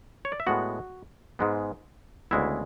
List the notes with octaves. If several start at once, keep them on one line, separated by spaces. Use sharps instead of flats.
C#5
D5
E5
A2 G#3 B3 F#4 F#5
G#2 G#3 B3
D2 C#3 G#3 B3 E4 E5